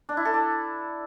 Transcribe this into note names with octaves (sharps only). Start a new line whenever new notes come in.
D4
E4
A4
D5